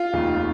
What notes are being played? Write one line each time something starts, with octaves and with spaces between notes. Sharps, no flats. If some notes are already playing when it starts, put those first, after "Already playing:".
Already playing: F4
F1 D#2 D#3